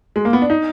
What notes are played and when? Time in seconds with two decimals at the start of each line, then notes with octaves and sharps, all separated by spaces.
0.16 G#3
0.25 A#3
0.33 B3
0.42 D4
0.50 D#4